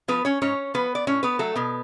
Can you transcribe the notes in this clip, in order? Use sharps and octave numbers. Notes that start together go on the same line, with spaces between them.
F3 B3 B4
C#4 C#5
G#2 C#4 C#5
F3 B3 B4
D5
A2 C#4 C#5
B3 B4
F#3 A3 A4
B2 B3